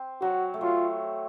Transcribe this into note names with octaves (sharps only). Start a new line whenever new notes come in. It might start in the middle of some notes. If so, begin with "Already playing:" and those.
Already playing: C4
F#3 F#4
A3
F#3 F4